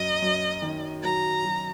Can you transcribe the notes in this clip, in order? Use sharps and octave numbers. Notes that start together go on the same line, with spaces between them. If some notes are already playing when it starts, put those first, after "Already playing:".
Already playing: F#2 D#5
F#2
D#3
F#3 A#5
F#3